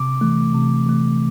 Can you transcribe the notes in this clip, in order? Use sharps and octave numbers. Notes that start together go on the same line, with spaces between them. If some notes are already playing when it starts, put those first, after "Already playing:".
Already playing: C3 D6
E3 A3
C3
E3 A3